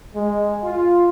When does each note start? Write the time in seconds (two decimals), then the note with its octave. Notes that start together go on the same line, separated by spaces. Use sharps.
0.14 G#3
0.63 F4